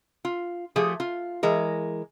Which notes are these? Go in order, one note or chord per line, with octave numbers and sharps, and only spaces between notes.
F4
F3 A3 G4 G#4
F4
E3 G#3 A#4